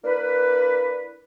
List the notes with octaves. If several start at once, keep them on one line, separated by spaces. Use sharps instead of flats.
A#3 D4 E4 B4